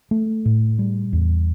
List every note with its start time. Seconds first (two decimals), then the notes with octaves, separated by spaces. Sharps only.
0.11 A3
0.46 A2
0.79 G3
1.13 E2